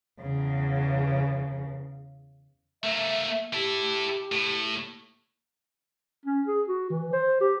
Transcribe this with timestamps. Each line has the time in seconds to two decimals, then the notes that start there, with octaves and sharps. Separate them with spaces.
0.21 E2 C#3
2.83 A3 A#3 E5
3.54 E4 G4 A4
4.32 A2
6.26 C#4
6.47 G#4
6.68 F#4
6.90 E3
7.13 C5
7.41 G4